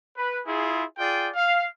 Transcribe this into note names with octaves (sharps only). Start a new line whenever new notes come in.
B4
E4 F4 G#4
F4 G#4 D5 G5
F5